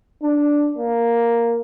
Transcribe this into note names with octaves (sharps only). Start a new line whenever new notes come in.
D4
A#3